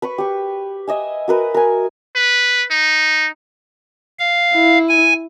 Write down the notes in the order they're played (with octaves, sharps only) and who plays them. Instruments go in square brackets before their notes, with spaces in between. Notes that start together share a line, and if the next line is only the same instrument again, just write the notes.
[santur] B4 B5 C#6
G4 C#6
D#5 E5 G#5
F#4 A#4 B4
A#4 G#5
[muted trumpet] B4
D#4
[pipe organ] F5
[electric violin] E4
[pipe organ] G#5